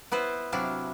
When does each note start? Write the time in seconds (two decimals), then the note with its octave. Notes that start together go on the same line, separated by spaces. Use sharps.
0.12 B3 E4 B4 C5
0.52 C3 F#3 D4 E4 F5